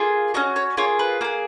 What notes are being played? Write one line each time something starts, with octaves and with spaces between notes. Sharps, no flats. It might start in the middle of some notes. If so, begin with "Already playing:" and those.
Already playing: A#3 F4 G#4
C#4 F#4 D#5
C#5
A#3 F4 G#4 C#5
B4
A#3 F4 G#4